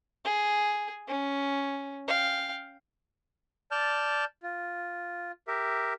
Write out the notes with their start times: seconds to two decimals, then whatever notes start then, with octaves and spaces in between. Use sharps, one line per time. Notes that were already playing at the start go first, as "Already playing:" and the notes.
0.24 G#4
1.08 C#4
2.08 F5 G5
3.71 D5 A5 F6 G6
4.43 F4
5.47 G4 A#4 E5